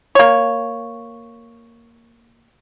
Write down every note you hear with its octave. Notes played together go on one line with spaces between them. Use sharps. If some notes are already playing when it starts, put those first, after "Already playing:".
A#3 C#5